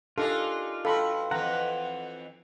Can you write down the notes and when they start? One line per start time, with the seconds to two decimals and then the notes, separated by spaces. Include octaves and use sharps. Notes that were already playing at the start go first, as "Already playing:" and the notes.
0.18 D4 D#4 F4 G4 A4 A#4 G#5
0.85 G2 F#4 A4 F5 G5 B5 C6
1.31 F2 E3 B4 F#5 A#5